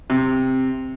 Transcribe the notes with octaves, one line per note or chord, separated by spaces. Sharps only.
C3